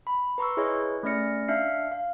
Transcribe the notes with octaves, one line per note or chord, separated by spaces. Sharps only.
B5
B4 A#5 C6 C#6 E6
E4 G#4 B4 C#5 D#5
A3 C#4 D5 F6 A#6 C#7
D4 E5 F5 F6 C7 C#7
F5